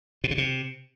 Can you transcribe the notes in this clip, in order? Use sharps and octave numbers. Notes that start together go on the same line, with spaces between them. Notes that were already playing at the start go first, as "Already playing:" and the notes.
B2
C#3
C3